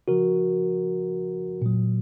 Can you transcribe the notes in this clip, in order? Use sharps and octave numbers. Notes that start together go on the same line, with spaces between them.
C#3 F3 F#4 A#4
A#2 F#3